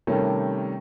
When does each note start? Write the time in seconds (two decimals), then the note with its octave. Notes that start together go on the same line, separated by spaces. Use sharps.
0.07 C3 D#3 G3 A3 C#4